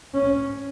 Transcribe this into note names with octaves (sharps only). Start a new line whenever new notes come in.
C#4